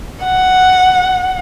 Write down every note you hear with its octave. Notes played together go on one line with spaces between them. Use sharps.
F#5